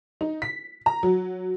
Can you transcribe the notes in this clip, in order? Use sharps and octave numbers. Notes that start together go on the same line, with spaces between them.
D#4
B6
A#5
F#3